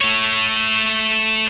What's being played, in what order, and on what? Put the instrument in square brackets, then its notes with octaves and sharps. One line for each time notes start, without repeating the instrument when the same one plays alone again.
[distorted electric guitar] A3 C#5